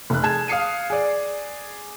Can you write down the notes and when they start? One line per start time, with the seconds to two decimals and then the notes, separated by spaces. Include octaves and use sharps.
0.10 F1 F#6
0.23 G#4 A5 G#6 E7
0.48 F5 D#6 C7 C#7 D#7
0.90 G#4 D5